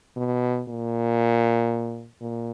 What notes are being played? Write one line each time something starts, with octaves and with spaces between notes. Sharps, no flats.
B2
A#2
A#2